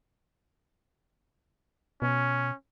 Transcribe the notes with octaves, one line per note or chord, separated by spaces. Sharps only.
B2 C#4